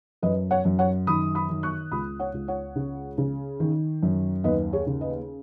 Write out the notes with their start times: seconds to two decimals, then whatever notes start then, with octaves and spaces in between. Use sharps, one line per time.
0.22 F#2 B4 D#5
0.51 C#5 F#5
0.65 F#2
0.79 C#5 F#5
1.07 D#3 B5 D#6
1.35 B5 D#6
1.49 D#3
1.63 C#6 F#6
1.92 C#2 B5 D#6
2.19 C#5 F#5
2.34 C#2
2.48 C#5 F#5
2.76 C#3
3.18 C#3
3.60 D#3
4.03 F#2
4.44 D#2 B4 D#5
4.73 G#4 C#5
4.87 C#3
5.01 B4 D#5